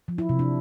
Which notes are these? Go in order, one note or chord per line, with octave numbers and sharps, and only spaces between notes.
F3
E4
C3
D4